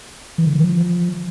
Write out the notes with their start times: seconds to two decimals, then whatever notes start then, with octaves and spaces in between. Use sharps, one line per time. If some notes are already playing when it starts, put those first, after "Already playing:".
0.38 E3
0.47 D3
0.55 E3
0.64 F3